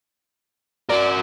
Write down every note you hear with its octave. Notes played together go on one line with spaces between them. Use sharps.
F#4 A#4 D5